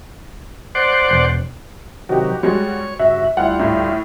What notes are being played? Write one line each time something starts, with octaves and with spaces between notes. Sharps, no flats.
C5 D5 F#5
E1
C3 D#3 F#3 F#4 G4
G3 G#3 F#4 C#5
G2 C#3 F#4 E5
D2 G3 E4 F4 F#5
A2